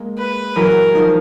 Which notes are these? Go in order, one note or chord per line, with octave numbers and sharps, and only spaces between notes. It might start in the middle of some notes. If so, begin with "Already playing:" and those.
Already playing: G#3 A#3
B4
E3 F#3 A#4
D#3 F3